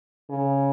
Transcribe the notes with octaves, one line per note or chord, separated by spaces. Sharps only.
C#3